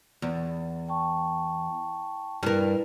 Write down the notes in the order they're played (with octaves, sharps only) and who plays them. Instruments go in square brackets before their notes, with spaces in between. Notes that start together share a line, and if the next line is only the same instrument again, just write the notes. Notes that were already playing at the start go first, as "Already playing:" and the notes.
[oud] E2
[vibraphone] G5 A5 C#6
[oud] G2 A#4 [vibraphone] E4 B4